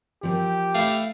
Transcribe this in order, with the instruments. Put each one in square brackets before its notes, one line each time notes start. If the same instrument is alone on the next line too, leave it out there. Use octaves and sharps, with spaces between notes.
[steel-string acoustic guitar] F3 C4 A#4 [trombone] G4
[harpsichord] A3 E4 [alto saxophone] F5